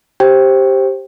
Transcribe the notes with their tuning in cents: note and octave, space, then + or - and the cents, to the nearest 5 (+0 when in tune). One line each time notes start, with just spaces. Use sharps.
G4 +0 C5 +15 G5 +0